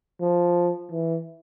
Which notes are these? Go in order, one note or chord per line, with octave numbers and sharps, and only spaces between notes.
F3
E3